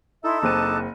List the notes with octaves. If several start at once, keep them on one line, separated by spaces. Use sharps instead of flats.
D#4 E4 A4 E5 C6
F#1 C4 A5 D6 F#6 D#7